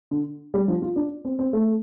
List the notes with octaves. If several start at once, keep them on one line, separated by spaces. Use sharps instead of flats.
D3
G3
F3
F4
D4
C4
C4
A3